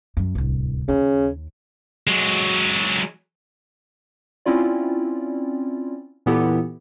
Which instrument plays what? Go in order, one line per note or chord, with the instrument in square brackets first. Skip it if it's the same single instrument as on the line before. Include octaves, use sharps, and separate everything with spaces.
[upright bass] F#2
D1 C2
[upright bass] D#2 [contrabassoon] C#3
[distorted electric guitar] F#3 G#3
[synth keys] C4 C#4 E4 F4 D5
A#2 E3 B3 E4 G4 A4